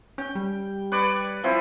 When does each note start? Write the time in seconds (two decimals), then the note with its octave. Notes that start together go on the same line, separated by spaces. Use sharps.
0.18 C#4 G5
0.35 G3
0.92 B4 C#5 D5
1.44 F3 C4 E4